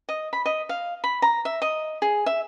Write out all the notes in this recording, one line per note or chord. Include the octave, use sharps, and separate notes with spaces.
D#5
B5
D#5
F5
B5
A#5
E5
D#5
G#4
E5